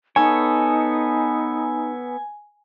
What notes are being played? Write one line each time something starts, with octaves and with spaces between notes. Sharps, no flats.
B3 D#4 A4 C#5 G#5